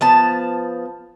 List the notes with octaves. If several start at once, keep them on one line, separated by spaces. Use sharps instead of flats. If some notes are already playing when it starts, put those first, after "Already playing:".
F3 B3 A5